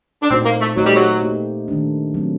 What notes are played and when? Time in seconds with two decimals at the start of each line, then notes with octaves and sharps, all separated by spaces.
0.23 D4
0.30 A#2 A3 C4 D#4 F#4 C5
0.45 A#3
0.61 A3
0.77 F#3 A3 D#4 G4 C5 D#5
0.86 G3
0.96 F#3
1.23 A#3 D#4 G4
1.68 D#3 A3 D4
2.14 F#3 A3 C4